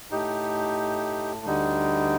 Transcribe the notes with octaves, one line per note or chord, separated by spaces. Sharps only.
A2 A3 D#4 G4
D2 D3 G3 D#4